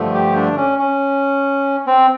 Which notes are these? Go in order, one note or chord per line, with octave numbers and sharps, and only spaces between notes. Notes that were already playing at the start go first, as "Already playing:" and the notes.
Already playing: G2 D3 F3 A3
G4
D4
C#4
C#4
C4